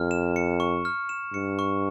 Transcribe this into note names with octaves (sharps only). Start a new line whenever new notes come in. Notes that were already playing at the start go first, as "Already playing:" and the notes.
Already playing: F2 F6
E7
C#7
C#6
F6
E7
G2 C#7
C#6